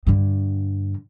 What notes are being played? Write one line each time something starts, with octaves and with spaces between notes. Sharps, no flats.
G2 D3